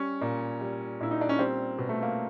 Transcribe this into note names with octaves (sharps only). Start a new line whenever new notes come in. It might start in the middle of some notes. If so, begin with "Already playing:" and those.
Already playing: G3 C#4
A#2
G3
A#2 E4
D#4
D4
C#4
G3 C4
B2
A3
A#3